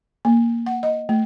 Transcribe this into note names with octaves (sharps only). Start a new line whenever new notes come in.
A#3
F#5
D#5
A3